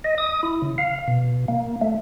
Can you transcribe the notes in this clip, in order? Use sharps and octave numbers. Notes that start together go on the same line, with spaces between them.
D#5
D#6
E4
C#3
F5
B2
A#3
A3